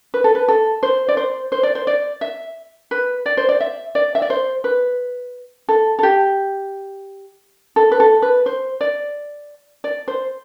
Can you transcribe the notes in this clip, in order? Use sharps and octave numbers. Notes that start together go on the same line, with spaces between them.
B4
A4
B4
A4
C5
D5
C5
C5
D5
C5
D5
E5
B4
D5
C5
D5
E5
D5
E5
D5
C5
B4
A4
A4
G4
A4
B4
A4
B4
C5
D5
D5
C5